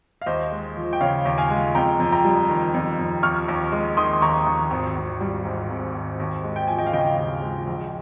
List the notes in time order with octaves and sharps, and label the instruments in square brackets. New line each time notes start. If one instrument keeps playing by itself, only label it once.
[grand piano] F5
D#2 C5 D#5
G#3
F3
G5
C#3 C#5 F5
D#2
F5 G#5
G#3
F2 G5 A#5
F2
G5 A#5
G3
D#3
F2
F2
D#2 C#6 F6
D#2
G#3
D#3 C6 D#6
D#2 A#5 C#6
D#2
G#1
G#1
G3
G#2
G#1
G#1
D#2
G#3
G5
F3 G#5
D#5 G5
F5
C#3 D#5 G5
D#2
G#3
A#1